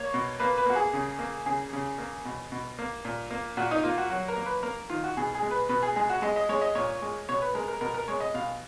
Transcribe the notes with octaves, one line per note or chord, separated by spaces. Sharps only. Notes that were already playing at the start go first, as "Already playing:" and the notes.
Already playing: A#3 C#5
B2
A#3 B4
B4
A#3 F#4
G#4
C#3
A#3
C#3 G#4
C#3
A#3
B2
B2
A#3
A#2
A#3
A#2 F#4
D#4
A#3 F4
F#4
F#3 F#4
A#4
A#3
B4
A#3 A#4
D#3 F4
F#4
B2 G#4
G#4
G#3
B4
B2 B4
G#4
G#3 G#4
F#4
G#3 D#5
D#5
G#3 C#5
D#5
A#2 C#5
G#3
B2 C#5
B4
G#3 A#4
A#4
B2 A#4
A#4
G#3 C#5
D#5
B2 F5